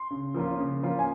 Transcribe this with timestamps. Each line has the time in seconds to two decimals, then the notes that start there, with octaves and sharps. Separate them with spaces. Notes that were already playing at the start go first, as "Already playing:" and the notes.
Already playing: C6
0.11 C#3
0.34 F3 A#3 C#4 F4
0.59 C#3
0.83 F3 A#3 C#4 F4
0.99 G#5